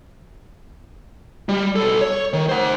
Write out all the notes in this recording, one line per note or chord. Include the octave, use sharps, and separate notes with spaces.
G3
B1 A4
C#5
D#3
C5 F#5